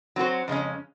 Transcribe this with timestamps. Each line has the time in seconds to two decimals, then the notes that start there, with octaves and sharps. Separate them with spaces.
0.16 F#3 C4 F#4 C5
0.48 F2 C#3 G#3 C#4